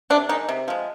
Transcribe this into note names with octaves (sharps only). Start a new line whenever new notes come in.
C3 D4
D#3 G#3 D#4
C3
F3 G#3